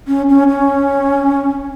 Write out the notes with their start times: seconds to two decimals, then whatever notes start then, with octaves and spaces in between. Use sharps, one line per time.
0.08 C#4
0.29 C#4
0.49 C#4